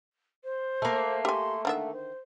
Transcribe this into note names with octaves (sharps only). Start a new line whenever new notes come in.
C5
A3 A#3
G4 G#5 C6
D3 D#3 E5 F#5
C5